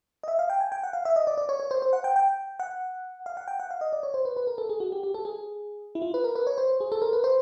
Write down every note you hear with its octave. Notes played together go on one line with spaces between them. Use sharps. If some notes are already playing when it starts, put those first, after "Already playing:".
D#5
E5
F5
G5
G#5
G5
F#5
F5
E5
D#5
D5
D5
C#5
C#5
C5
C5
F#5
G5
G5
F#5
F5
F#5
G5
F#5
F5
D#5
D5
C#5
C5
B4
B4
A#4
A4
G#4
F#4
G4
G4
A4
G#4
E4
F4
B4
A#4
B4
C#5
C5
G#4
A4
A#4
B4
C5